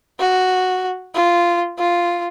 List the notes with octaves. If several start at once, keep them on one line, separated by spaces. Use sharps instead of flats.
F#4
F4
F4